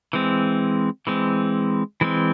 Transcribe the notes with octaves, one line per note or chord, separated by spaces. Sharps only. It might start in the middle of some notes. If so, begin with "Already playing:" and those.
E3 G#3 C4
E3 G#3 C4
E3 G#3 C4